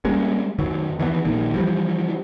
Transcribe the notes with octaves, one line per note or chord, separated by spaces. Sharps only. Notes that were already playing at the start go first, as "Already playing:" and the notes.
G3 G#3 A#3 C#4
F#2 D#3 F#3
D#3 E3 A3 B3
A#1 D#3 A#3
E3 F3 G3